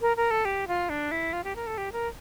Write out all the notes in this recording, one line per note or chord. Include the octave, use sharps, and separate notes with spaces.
A#4
A#4
A4
G4
F4
D4
E4
F4
G4
A#4
A4
G4
A#4